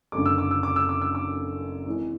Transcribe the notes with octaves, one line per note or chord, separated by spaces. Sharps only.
F#1 F#2 D3 G#3 D6
E6
D6
E6
D6
E6
D6
E6
D6
G#1 G#2 E3 G#3